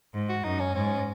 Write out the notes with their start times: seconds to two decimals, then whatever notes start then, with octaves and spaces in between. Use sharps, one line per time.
0.14 G#2
0.29 F#4
0.44 F#2 D#4
0.59 C#4
0.75 G#2 C#4